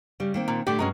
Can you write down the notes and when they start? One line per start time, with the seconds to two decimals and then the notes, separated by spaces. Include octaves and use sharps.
0.20 C#3 G3
0.34 D#3 A#3 C4
0.48 A#2
0.67 A2 D3 A3 G4 D5
0.79 G2 F#3 G#3 C#4